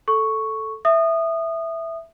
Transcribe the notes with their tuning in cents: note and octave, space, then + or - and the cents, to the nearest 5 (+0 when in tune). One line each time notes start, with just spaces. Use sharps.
A4 +0 C#6 +0
E5 +0 D#6 -20